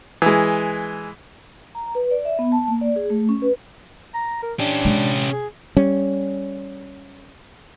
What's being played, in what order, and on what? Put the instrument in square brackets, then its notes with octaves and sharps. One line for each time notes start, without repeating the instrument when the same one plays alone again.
[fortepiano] E3 G#3
[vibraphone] A#5
B4
D5
E5
B3
A5
A#3
D5
G#4
A3
C#4
B4
[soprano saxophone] A#5
A#4
[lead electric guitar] C#4 G4 [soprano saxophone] D4
[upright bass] C3 G#3
[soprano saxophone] G#4
[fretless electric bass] G3 C#4